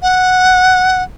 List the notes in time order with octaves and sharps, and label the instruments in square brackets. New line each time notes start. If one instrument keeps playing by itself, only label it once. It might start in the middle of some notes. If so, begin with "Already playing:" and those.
[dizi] F#5